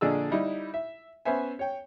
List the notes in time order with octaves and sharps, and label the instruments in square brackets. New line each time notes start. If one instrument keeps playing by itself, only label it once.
[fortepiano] A#1 D3 G#4 D5 D#5 E6
G3 D#4 E4
E5
B3 C#4 C5 E5 G#5
C#5 G5